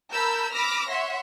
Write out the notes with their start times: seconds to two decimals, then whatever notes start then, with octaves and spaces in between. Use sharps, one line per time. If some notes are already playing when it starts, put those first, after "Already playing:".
0.11 A#4 A5 B5 E6 G6
0.52 B5 D6 E6 F6 A#6
0.88 C#5 E5 F#5 C6